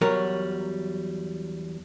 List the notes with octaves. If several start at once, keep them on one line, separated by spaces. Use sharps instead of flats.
E2 F#3 G3 A#4 C#5